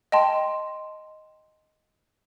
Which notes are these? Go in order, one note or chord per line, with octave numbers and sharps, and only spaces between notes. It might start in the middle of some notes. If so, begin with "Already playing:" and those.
D#5 G5 A5 C6